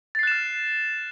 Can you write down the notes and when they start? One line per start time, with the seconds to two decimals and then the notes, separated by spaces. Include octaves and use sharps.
0.15 A6
0.19 C7
0.23 F#6
0.27 E7
0.32 F6